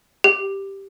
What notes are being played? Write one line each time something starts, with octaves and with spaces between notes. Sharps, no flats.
G4